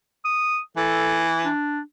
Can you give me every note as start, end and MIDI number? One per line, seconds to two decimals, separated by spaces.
0.25 0.60 87
0.77 1.47 52
0.77 1.21 69
1.45 1.80 62